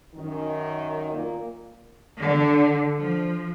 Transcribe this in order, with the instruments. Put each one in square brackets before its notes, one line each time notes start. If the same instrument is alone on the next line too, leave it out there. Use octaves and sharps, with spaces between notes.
[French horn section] F#2 D#3
A#2 A#3
[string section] D3
F3